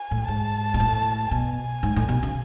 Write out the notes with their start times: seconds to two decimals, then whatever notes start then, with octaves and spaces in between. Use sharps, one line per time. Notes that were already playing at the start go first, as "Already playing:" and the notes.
Already playing: G#5
0.11 A2
0.28 G#2 A5
0.74 B2
0.80 A2
1.31 B2 G#5
1.83 G#2
1.96 A2
2.08 B2
2.23 C#3